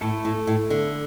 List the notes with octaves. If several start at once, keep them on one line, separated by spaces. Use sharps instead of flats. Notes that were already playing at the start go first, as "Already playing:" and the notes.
A2 A3 E4 A4
A2
A2
D3